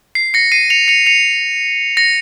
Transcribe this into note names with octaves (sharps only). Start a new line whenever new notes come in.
C7
A#6 C#7
C7 D#7
C#7 F7
C#7 F7
C#7 F7
A#6 C#7